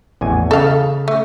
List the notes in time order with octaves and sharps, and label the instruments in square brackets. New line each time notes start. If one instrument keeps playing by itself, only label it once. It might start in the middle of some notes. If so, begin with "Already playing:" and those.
[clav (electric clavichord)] A1 E2 G#5
[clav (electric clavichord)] C#3 [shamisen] A4 F5
[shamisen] A3